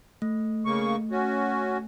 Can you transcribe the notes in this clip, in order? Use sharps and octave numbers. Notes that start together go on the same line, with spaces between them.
A3
C#3 A#3 C#6
C#4 F#4